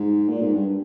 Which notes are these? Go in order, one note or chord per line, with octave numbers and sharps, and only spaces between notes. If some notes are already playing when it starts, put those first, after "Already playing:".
Already playing: G#2
A#2
G#2
G2